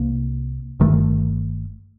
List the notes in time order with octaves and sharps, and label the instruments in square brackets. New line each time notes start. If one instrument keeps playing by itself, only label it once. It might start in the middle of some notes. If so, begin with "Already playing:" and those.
Already playing: [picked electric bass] C2 C3 A#3
G1 G2 D#3 A3